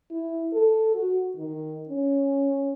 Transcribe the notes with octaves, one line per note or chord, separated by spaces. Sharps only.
E4
A4
F#4
D#3
C#4